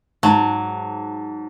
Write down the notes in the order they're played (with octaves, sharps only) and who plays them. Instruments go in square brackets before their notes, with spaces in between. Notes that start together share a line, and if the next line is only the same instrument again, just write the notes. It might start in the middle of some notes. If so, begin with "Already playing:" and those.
[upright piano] G#2 A5 [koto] F#3